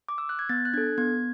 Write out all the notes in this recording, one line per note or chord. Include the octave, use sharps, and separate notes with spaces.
D6
E6
F#6
G#6
B3 A6
F#6
D4 A4 G#6
B3 G#6